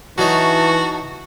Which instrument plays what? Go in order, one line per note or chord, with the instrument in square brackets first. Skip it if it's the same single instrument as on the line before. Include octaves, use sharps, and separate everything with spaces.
[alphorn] E3 [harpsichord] F#3 D#4 [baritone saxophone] F#4 [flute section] A5 C#6